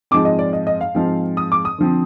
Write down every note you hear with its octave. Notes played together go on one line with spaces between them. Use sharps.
G#2 F3 G#3 C4 D6
D#5
D5
D#5
D#5
F5
G#2 F3 G#3 C4
D#6
D6
D#6
D3 F3 C4